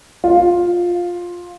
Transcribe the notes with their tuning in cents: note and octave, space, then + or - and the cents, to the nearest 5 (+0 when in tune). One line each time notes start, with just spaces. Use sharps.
F4 +10